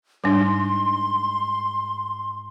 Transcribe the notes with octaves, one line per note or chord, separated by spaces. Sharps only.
G#2 G3 D4 C6